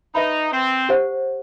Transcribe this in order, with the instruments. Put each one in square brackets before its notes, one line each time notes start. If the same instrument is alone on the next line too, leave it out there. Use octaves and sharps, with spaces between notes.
[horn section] D#4 [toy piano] B4 E5 B5
[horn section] C4
[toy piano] G4 C5 F#5